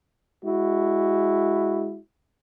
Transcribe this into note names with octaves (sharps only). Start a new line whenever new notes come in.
G#3 E4 F#4